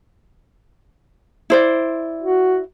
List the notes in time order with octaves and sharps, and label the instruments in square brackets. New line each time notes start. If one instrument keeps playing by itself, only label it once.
[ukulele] E4 C5 D5
[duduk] F#4